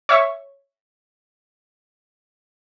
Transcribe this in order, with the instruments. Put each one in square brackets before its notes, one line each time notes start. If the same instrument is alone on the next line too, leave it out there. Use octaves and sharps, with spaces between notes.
[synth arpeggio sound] C#5 E5 C#6